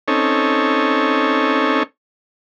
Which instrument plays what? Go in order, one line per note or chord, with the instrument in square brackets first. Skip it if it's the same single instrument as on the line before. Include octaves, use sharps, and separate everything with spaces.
[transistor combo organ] C4 C#4 D#4 A4 C#5